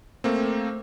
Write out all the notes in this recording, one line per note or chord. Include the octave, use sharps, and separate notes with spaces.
A3 A#3 C4